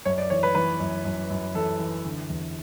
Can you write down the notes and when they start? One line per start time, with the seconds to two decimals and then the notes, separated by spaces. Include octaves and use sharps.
0.05 F#2 C#5
0.18 D5
0.30 E3 C#5
0.43 B4
0.55 E3 B4
0.80 F#2
1.05 F#2
1.30 F#2
1.55 E3 A4
1.79 E3
2.05 D3
2.29 E2